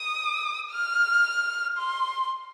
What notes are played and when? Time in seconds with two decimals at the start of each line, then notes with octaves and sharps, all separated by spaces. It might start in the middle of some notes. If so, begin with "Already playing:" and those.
Already playing: D#6
0.71 F6
1.78 C6